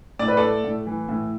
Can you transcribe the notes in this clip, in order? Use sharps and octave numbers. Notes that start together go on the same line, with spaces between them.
A2 D5
B4
A3 A4 D5
A2
E3
A2